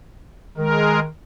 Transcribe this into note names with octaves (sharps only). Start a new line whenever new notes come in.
D#3 G#3 A#4